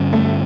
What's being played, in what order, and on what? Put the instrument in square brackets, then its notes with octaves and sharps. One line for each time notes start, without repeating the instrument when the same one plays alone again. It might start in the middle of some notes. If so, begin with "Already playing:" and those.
Already playing: [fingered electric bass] G2 D3 G3 C#4
[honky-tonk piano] A3